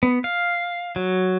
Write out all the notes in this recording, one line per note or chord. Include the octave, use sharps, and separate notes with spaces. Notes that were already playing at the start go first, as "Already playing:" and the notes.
B3
F5
F#3